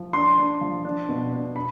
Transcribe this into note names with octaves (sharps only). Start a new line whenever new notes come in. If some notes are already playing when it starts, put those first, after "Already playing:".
Already playing: F3
D4 C6
D4
F3
D4
B2
D4
B5